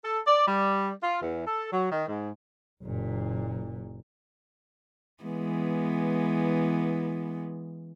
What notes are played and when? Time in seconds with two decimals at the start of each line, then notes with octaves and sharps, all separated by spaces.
0.04 A4
0.27 D5
0.47 G3
1.02 F4
1.21 E2
1.47 A4
1.72 F#3
1.92 D#3
2.08 G#2
2.84 F#1 A#2
5.24 E3 G#3 B3